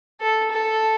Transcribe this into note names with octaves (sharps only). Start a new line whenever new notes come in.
A4
A4